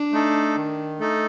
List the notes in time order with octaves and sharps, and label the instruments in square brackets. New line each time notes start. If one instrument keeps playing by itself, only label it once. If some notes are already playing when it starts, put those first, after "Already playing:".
Already playing: [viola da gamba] D4
[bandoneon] A3 D#4 A4
D#3
A3 D#4 A4